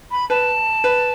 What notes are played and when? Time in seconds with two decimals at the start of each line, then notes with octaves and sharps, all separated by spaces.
0.11 B5
0.29 B4 A5
0.84 B4